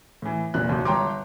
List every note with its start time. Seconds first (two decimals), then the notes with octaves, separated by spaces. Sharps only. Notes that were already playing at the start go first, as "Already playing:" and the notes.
0.22 A2 E3
0.54 F1 A#2 F#6
0.68 D#2 C3 F#3
0.85 G1 C#5 G5 A#5 C6 D6